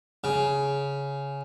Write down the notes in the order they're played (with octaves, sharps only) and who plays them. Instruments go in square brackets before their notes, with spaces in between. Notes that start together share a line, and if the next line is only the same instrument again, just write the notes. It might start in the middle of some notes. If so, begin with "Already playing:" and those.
[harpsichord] C#3